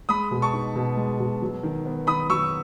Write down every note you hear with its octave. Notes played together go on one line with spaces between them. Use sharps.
G#3 B5 D#6
B2
A5 C#6
D#4
B2
G#3
B2
F#3
D#3
B3
D#3 B5 D#6
F#3 C#6 E6